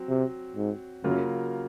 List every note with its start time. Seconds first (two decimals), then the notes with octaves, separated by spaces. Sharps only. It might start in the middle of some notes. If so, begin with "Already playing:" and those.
Already playing: F#3 C4
0.09 C3
0.56 G#2
1.04 F#2 C#3 F#3 A#3 F4